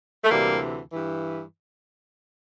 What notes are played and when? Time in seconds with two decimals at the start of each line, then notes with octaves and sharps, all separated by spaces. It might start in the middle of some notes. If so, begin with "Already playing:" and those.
0.24 A3
0.29 D2 C3 E3 G3 A#3
0.92 G2 E3